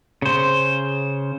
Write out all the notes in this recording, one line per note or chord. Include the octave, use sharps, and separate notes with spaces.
C#3 C5